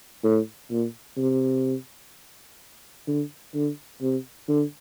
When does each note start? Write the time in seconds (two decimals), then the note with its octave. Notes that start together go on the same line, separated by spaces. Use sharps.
0.24 A2
0.71 A#2
1.17 C3
3.07 D3
3.54 D3
4.02 C3
4.48 D3